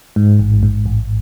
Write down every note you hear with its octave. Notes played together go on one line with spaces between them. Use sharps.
G#2
A1
G#2
A1